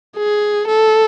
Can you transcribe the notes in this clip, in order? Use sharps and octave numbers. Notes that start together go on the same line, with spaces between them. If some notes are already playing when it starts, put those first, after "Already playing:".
G#4
A4